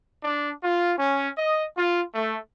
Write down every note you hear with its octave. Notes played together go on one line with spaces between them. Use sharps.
D4
F4
C#4
D#5
F4
A3